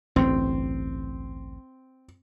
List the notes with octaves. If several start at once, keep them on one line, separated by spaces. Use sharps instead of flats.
A1 D2 G2 C4